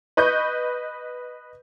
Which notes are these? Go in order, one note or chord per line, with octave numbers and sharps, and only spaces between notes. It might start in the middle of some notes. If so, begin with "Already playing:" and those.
B4 D#5 C#6 G6